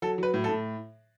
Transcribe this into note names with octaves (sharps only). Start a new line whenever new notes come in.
F#3 A4
F#3 B4
A2
A4
A2